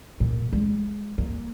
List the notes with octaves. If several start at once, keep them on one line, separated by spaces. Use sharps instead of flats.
A#2
G#3
A#3